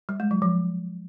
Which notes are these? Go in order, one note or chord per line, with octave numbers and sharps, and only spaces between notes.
G3
G#3
F#3
F3